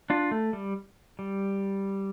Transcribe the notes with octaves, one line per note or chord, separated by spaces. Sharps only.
D4 F4
A3
G3
G3